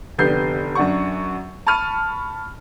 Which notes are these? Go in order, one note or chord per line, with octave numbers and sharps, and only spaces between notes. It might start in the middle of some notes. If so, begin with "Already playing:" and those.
F1 D3 B3 G4 G6 C7
F#2 D4 F#5 C#6
A5 B5 C#6 F6 D#7